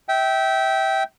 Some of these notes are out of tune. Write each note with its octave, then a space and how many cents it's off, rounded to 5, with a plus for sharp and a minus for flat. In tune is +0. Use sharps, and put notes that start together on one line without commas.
E5 -20 G5 -15